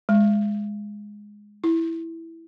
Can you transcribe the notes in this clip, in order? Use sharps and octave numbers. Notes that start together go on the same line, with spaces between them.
G#3
E4